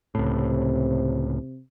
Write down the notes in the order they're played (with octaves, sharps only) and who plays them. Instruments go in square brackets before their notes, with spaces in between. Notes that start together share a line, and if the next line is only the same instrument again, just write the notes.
[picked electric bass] C#2 A2 [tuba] C3